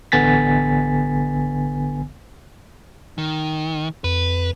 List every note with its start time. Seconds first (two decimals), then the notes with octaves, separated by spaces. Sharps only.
0.12 A1 D3 B3 G#5 A6 B6
3.18 D#3
4.04 F2 B4